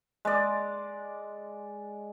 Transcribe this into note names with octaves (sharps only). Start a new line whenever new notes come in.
G#3 D5